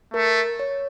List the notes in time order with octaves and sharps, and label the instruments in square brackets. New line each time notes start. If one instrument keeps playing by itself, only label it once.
[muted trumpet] A3 [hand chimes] A#4
[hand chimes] C#5